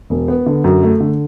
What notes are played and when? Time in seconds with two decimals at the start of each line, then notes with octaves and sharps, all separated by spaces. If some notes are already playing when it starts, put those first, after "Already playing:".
0.10 E1
0.28 B3
0.46 D3
0.64 F#2
0.83 A3
1.00 D3